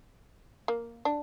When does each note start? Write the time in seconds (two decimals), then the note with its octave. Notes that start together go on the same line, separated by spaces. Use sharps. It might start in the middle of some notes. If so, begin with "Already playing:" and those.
0.68 A#3
1.05 D4